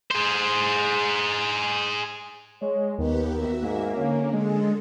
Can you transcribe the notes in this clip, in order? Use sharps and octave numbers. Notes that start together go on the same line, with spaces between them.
G#4 C5
G#3 C#5
D#2 D#3 B3 G4 B4
F#4 A#4 E5
G#2 A#3
D3 C#4
D3 G#3 G#4 A4